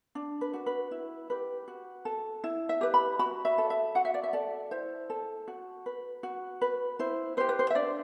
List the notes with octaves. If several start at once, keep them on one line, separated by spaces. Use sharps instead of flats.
D4
B4
F#4 B4
B4
E4
G4 B4
F#4
A4
E4
E5
G4 B4
B5
F#4 B5
E5
A4
E5
F#4 F#5
E5
D5
E5
A4 D5
E4 C5
A4
F#4
B4
F#4
B4
E4 C5
G4 B4 C5
B4
C5
E5
D4 D5